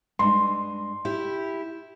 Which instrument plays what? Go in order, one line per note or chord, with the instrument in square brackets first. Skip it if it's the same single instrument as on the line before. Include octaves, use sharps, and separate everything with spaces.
[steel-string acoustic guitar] G2 G#3 [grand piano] C6
[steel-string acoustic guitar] E4 G4